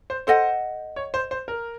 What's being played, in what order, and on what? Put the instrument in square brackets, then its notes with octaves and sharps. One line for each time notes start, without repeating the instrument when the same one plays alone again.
[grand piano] C5
[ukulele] A4 D#5 F#5 [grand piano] C5
[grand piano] C#5
C5
C5
A#4